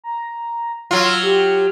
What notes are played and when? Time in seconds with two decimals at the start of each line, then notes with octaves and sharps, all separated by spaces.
0.04 A#5
0.91 F#3 F4 E6
1.23 G4